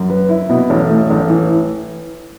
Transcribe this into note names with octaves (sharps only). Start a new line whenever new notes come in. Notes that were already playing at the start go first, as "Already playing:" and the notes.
Already playing: F#2
B4
E4
B2
A1
A3
A1
E3